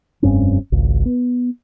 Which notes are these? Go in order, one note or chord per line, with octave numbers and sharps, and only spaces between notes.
F1 G2 C4 C#4
G#1 C#2
B3